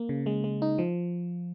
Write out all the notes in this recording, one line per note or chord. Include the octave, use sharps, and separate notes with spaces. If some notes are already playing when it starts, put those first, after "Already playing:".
Already playing: A#3
C#3
G#3
G#3
D#4
F3